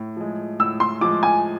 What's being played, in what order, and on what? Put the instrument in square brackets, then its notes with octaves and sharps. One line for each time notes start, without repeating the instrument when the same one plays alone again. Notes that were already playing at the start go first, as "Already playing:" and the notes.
Already playing: [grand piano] A2
F3 G#3
[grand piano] A2 [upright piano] E6
[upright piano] C6
[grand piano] F3 G#3 [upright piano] D6
[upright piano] G#5